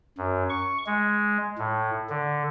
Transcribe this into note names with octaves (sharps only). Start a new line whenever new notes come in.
F#2
C#6
G#3
A2
D3